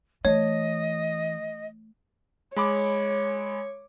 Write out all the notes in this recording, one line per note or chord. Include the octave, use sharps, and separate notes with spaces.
E3 A3 C#5 D#5
G#3 C#5 B5 D6